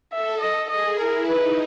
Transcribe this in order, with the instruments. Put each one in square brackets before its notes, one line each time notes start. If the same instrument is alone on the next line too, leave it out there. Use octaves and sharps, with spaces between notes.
[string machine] A4 [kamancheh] E5
[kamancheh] D#5
[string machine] G#4 [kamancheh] D#5
[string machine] E4 [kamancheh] A#4
[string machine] D#4 [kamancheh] B4